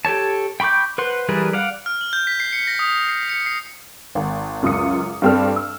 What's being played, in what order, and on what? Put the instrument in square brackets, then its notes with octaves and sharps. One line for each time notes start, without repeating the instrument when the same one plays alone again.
[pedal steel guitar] G4 A4 C#5 A5
G5 B5 C#6 D6 G6
B4 C5 F#5 C6
E3 G3 G#4 A#4 B4
D5 F5 F#5
[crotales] F6
F#7
G6
B6
C7
C#7
A#6
D#6
D#6
C7
C#7
C7
[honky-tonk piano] G#1
C#2 F#2 F4 D6 D#6 C#7
G2 G3 C4 D4 A4 F6
E6